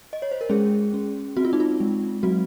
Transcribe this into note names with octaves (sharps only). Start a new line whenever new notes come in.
D#5
C#5
C5
A#4
G#3 C#4 G#4
C#4
C4 F#4
F4
D#4
F4
G#3
F#3 C4 F#4